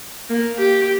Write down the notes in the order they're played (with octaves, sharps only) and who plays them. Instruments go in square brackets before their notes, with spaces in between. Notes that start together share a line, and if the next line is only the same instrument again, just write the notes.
[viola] A#3
G4